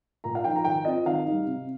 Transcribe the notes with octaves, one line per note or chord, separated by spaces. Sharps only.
A#2 A#5
F5
F3 D#4 G5
A#5
D#3 G5
C4 F4 D#5
D#3 F5
G3 D#4
C3